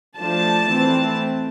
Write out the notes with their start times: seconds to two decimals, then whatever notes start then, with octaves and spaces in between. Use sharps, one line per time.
0.18 F3 A3 D4 A5
0.70 E3 A3 C4